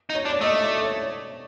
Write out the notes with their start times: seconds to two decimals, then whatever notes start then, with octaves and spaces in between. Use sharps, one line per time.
0.10 D#4
0.15 C#5
0.25 D4
0.29 D5
0.41 A3 D#5
0.63 D5
0.84 C#5